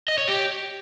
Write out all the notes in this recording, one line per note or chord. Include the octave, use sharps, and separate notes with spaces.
D#5
C#5
G4